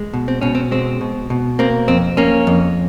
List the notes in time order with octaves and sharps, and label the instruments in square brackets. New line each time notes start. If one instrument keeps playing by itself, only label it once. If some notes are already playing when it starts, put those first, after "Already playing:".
Already playing: [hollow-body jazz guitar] G#3
B2
C4
B2 C#4
C4
G#3 C4
B2
B2
A#3 C4
F2 C4
A#3 C#4
F2